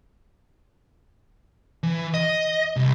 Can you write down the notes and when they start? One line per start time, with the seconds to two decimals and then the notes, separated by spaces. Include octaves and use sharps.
1.83 E3
2.14 D#5
2.76 C2